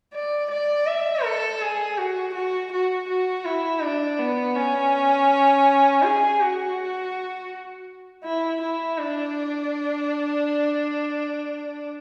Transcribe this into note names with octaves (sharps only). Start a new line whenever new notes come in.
D5
D5
E5
A4
G#4
F#4
F#4
F#4
F#4
E4
D4
B3
C#4
G#4
F#4
E4
E4
D4